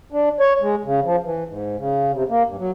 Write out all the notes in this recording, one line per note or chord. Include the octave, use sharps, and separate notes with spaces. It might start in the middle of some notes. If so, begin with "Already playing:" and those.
D4
C#5
G#3
C#3
F3
E3
G#2
C#3
C3
A#3
G2
F#3